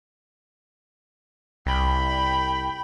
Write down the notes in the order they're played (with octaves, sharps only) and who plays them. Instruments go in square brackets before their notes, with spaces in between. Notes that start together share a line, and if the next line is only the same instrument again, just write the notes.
[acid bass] C2 [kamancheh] G5 B5